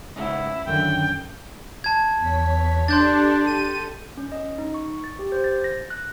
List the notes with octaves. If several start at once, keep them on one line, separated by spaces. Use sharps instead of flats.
G#2 C#3 E4 F#5
F#2 D3 D#3 C#4 G5
A5 G#6
E2 C#5 B6
D4 G4 A4 C6 G6 A6
D#7
C#4
D#5
D#4
C#6
A6
G4
C5
A6
A#6
F#6